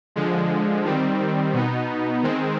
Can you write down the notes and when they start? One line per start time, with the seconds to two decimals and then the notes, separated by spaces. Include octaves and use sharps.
0.16 D3 F3 G#3
0.85 D#3 G3 C4
1.53 B2 B3 D#4
2.23 D#3 G#3 C4